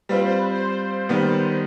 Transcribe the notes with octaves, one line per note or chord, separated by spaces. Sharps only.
G3 C4 F4 B4
C5
B4
C5
D#3 G3 B3